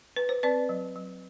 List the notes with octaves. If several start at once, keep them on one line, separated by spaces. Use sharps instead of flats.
B4
C5
C4 B4 D5
F#3
F#3